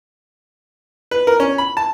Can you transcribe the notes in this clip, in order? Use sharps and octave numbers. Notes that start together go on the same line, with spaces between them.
B4
A#4
C#4
B5
A5